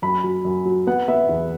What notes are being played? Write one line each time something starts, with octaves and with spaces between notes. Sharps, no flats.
F#2 B5
F#3
F#2
F#3
B3 F#5
B3 E5
E2